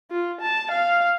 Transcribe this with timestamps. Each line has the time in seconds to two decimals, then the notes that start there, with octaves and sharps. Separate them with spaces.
0.11 F4
0.41 A5
0.72 F5